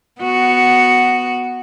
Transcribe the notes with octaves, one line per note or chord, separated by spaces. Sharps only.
B3 F#4